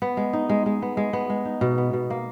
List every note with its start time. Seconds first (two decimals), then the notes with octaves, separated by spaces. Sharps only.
0.02 B3
0.17 G#3
0.33 D#4
0.49 G#3
0.66 G#3
0.82 B3
0.97 G#3
1.13 B3
1.30 G#3
1.45 D#4
1.61 B2
1.78 B3
1.93 B2
2.10 A#3